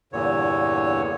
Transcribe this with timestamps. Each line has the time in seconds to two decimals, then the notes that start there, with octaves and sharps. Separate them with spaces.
0.13 E2 G2 A#2 D3 C#5